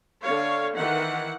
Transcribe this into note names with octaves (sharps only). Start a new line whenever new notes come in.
D3 C#5 F5
D#3 E3 F#5